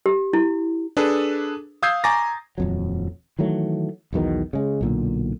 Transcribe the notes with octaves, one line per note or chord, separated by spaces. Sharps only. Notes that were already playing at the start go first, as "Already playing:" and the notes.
G4
E4
D4 G#4 A4 B4
F5 D#6 E6 G6 G#6 C7
G#5 A#5 C#6 D6 A6 A#6
D#1 F2 F#3
D#3 E3 F#3 A3
B1 E2 B2 D#3
C#3 G#3
B1 A#2 D3